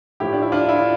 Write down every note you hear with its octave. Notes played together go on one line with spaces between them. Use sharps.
A2 F3 A3 E4 G4
D4
E4
D4 F4
E4
F4